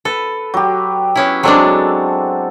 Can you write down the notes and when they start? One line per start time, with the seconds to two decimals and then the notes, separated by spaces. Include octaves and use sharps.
0.05 A4 B4
0.54 F#3 G4
1.16 B3 C#4 E4
1.43 F#3 G#3 C4 D4 F#4 A4